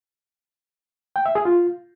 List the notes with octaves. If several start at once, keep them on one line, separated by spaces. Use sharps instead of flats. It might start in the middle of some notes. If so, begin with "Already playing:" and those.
G5
E5
G#4
F4